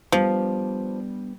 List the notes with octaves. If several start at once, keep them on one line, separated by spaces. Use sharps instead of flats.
F3 G3 B3 D4